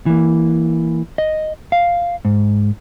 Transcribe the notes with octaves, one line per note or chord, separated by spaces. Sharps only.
E3 A#3
D#5
F5
G#2